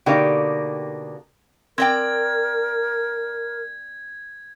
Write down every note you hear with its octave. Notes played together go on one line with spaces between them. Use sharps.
B2 D3 A#3 D#4 G4 G5
C4 A#4 D5 G5 G#6